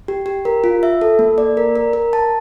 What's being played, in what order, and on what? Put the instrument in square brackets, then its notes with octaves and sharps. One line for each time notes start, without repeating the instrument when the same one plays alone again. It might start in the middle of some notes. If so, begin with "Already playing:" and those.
[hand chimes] G4
G4
A#4
F4
E5
A4
A#3
D5
A#4
A#4
A#4
A5